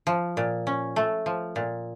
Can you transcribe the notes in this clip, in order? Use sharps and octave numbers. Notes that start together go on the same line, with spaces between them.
F3
A#2
C#4
A3
F3
A#2